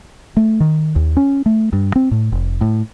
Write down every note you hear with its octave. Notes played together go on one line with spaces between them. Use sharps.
A3
D#3
D#2
C#4
A3
G2
C4
A2
F1
A2